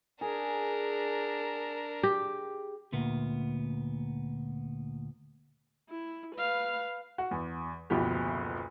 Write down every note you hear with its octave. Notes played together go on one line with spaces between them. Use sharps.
D4 G#4 A#4
G4
D2 A#2 B3
E4
B4 F5
F#4
E2
F#1 D2 B2 F3 B3 G4